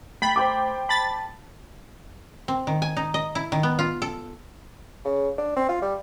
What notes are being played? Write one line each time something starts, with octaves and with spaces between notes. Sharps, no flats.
A3 G5 B5 A6 C7
C5 G5 D6
A5 B5 A6
C4
D#3
G#5
D#4
D#5
E4
D#3
B3
F4
A4
C#3
D4
C4
F4
G3